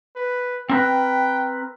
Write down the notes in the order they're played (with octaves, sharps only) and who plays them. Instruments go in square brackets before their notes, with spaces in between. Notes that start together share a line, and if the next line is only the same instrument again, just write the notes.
[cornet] B4
[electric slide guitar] C4 A#4 B4 [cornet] G5